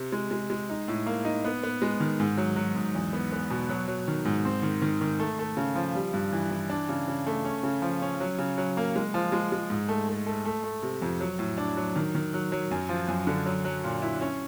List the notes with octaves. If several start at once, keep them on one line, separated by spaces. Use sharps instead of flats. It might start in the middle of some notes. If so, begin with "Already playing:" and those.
Already playing: C3
G#3
G#3
G#3
D#4
A2
A#3
D#4
B3
B3
G#3
D#3
G#2
F#3
F#3
G#2
E2
B3
B3
B2
F#3
F#3
D#3
G#2
C4
D#3
D#3
D#3
A3
A3
C#3
F3
G3
G2
E3
E3
D4
C#3
C#3
A3
C#4
C#3
F3
C#4
F#3
C#3
F#3
A#3
G#3
F3
G#3
G#3
G#2
A3
A3
A3
A3
A3
C3
F2
F#3
A2
D4
F#3
D#3
D#3
F#3
F#3
F#2
F3
F#2
D3
F#3
F#3
A#2
E4
C#4